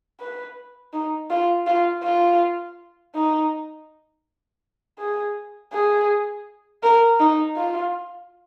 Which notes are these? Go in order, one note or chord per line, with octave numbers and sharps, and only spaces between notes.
B4
D#4
F4
F4
F4
D#4
G#4
G#4
A#4
D#4
F4